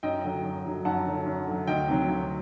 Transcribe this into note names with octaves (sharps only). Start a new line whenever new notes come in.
F#2 D#5 G5
D3 F#3
F#2
D3 F#3
F#2 F#5 A5
D3 F#3
F#2
D3 F#3
D2 D#5 G5
C3 D#3 F#3
D2